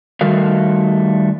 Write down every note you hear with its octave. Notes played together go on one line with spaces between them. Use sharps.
D#3 G3 A3 F#4 A#4 F5